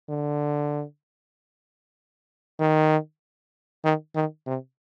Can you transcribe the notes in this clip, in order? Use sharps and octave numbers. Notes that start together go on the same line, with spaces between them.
D3
D#3
D#3
D#3
C3